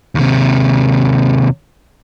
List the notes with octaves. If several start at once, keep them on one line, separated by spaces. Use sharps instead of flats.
D#2 C3